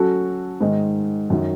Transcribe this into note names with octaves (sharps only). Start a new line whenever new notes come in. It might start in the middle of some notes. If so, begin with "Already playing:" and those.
Already playing: F#3 C#4 F#4 A4
G#2 D#3 G#3 D#4
F#2 D#3 F#3